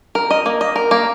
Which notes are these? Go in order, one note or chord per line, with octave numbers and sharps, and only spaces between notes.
A#4
D#5
A#3
D#5
A#4
A#3